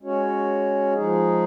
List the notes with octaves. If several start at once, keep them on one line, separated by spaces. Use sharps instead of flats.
G#3 C#4 F#4 C#5
F3 G#3 D#4 G#4